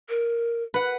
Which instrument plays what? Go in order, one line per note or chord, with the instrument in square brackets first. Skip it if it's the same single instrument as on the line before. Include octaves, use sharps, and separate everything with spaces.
[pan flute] A#4
[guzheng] B4 F#5